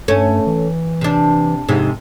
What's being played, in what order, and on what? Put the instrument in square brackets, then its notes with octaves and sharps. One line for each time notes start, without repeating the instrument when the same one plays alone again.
[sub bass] G2 [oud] A3 C#4
[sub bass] E3
[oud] C3 D4
F2 G#2 C3